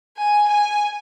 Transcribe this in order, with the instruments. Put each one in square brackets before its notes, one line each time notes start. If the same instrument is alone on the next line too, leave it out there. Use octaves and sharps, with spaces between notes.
[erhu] G#5
G#5